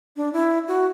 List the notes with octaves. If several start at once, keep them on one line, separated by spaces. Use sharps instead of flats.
D4
E4
F#4